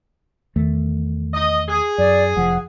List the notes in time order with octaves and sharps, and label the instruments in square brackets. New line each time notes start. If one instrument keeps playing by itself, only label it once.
[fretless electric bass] E2 D#3 A3
[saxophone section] D#5
G#4
[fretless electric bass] F#2 [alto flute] D5
[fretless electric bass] F1 F3 [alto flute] F#5